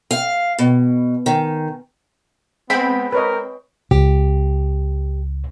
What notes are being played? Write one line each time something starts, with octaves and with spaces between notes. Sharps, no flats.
F5
B2
D#3
G#3 B3 C4 G5 B5
A#4 B4 C#5 D#5
C#2 G4